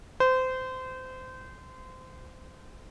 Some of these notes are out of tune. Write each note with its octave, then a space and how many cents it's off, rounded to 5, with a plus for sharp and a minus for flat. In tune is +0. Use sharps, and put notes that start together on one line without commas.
C5 -25